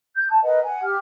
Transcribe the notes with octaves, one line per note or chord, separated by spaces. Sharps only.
G6
A5
A#4 B4 D#5 F#5
F#5 G#5
G4 F6